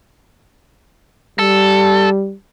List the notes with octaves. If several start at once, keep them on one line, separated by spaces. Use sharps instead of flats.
G3 A4